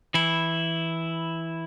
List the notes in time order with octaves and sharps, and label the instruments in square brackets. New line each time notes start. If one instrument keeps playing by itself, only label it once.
[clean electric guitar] E3 E4